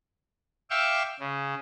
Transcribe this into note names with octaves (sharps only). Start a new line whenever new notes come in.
E5 F5 G5 C#6 D6 E6
C#3